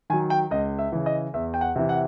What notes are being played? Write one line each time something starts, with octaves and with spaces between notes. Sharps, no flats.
D#3 F#3 G#5
G5
C#2 D#5
E5
C#3 E3
D#5
E2 E5
G5
F#5
C3 E3
F#5